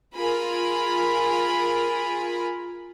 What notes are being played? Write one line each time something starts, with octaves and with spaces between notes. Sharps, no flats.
F4 G#4 A#4 B5